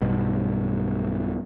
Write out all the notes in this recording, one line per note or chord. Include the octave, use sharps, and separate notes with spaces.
B1 G2 B2